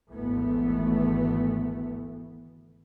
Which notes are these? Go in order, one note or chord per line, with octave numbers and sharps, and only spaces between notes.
G#1 D2 G#2 E3 A3 B3